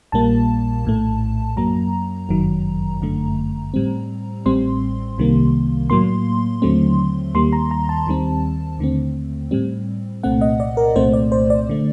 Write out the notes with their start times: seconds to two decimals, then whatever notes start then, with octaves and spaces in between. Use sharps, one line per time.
0.12 A#1 A#2 G3 A#3 A5
0.85 A#1 A2 A3
1.56 F#2 F#3 A#3 A#5
2.29 G1 F#2 D#3 F#3
3.01 G1 F#2 D3 A3
3.74 A2 G3 C4
4.46 A1 A2 G3 C4 C6
5.18 C2 C3 D#3 G3 A#3
5.90 A2 F#3 A#3 C6
6.62 D#2 D3 F#3 A3 C4
7.35 D#2 D#3 G3 A#3 C6
7.53 A#5
7.71 A#5
7.89 A5
8.07 D#2 D#3 G3 C4
8.79 D#2 D3 A3 C4
9.51 A2 G3 C4
10.23 C2 A#2 A3 C4 F#5
10.41 D#5
10.60 D5
10.77 A#4
10.96 C2 A#2 A3 C4 C5
11.14 D5
11.32 C5
11.50 D5
11.69 D3 A3